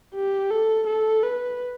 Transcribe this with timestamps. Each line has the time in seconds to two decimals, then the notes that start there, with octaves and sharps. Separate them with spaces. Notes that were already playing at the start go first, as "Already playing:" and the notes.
0.15 G4
0.51 A4
0.87 A4
1.23 B4